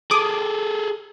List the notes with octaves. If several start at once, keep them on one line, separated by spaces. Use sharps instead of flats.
G#4 A4 D6 D#6